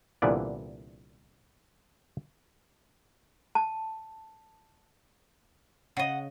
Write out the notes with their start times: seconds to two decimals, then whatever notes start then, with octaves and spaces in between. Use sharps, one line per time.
0.22 C2 A#2 D3 E3 B3 D5
3.55 A5
5.97 C#3 D#5 F#5